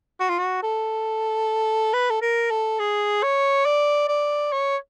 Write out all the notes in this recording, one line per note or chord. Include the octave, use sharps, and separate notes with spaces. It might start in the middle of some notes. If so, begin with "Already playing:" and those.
F#4
F4
F#4
A4
B4
A4
A#4
A4
G#4
C#5
D5
D5
C#5